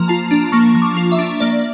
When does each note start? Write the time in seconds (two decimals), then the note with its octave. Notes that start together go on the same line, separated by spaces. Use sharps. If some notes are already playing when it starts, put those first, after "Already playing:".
Already playing: F3 A#3 A#5
0.08 F4 A5
0.31 D4
0.52 A#3 C#6
0.75 F3
0.82 D6
0.97 F4
1.12 E5
1.19 D4
1.40 A#3 D5